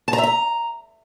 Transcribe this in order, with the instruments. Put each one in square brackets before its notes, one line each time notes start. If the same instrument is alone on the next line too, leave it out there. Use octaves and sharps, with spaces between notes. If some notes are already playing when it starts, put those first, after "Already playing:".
[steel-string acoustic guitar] A5
A#5
E5
A#5